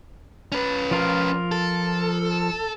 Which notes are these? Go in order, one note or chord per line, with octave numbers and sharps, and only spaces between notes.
C#4 B4
F3 F4 A#4
A4